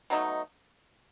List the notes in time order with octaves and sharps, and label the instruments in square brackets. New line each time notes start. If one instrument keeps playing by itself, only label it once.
[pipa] B2 F#3 A3 D#4